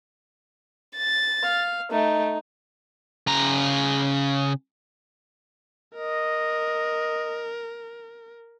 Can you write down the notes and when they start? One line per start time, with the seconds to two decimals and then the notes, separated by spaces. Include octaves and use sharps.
0.96 A6
1.43 F5
1.91 A3 D#4
3.27 C#3 A#5
5.95 A#4 D#5